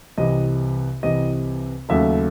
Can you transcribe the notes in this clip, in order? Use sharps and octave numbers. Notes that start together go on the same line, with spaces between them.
C2 C3 E3 D#5
C2 C3 E3 D#5
D#2 C#3 F#3 A3 E5